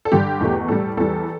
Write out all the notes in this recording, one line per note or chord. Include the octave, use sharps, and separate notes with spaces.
A4
G2 D3 G3 G4
E2 B2 A3
A2 G3 A4
E2 E3 G3 A4